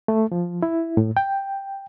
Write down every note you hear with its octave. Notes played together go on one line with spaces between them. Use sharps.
A3
F3
E4
A2
G5